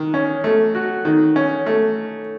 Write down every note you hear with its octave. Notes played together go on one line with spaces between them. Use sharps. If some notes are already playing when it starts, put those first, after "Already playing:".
Already playing: D#3
C#4
A3
F#4
D#3
C#4
A3